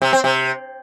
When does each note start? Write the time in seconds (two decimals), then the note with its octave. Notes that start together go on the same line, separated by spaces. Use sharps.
0.02 C3
0.13 C4
0.24 C3